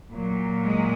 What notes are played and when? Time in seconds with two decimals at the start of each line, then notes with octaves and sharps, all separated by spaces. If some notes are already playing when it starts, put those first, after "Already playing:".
0.11 A#2 F#3
0.65 G#3